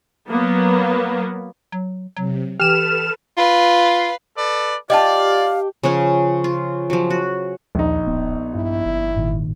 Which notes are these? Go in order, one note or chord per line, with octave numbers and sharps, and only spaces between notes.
F#3 A#3 B3
F#3
C3 F#3
E3 G4 A4 B4 F6 E7
F4 B4 F5
A4 B4 D5
F4 G4 D5 D#5 F5 G5 A5
C#3 F3 C#4 C#5
F4
F3 F#3
F#4
A#1 D#2 D#4
D1 B3
G2 E4
G1
G#1 A#2 D#3